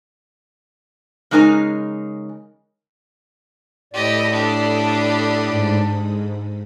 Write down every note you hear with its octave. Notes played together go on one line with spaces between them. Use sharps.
C#3 G#3 D#4 A#4 G#5
A2 G4 A4 D5 D#5 B5 D#6
D4 G4
G#2